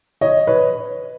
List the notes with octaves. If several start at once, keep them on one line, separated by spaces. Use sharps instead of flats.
C#5 D#5
B4 C#5